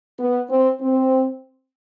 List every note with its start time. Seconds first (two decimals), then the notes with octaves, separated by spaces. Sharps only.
0.19 B3
0.49 C4
0.81 C4